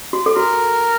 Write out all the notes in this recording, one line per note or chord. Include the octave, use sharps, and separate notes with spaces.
F#4
A4
F#4 A#4